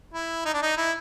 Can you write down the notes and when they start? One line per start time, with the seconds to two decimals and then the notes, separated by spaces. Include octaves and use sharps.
0.14 E4
0.45 D#4
0.53 D4
0.63 D#4
0.77 E4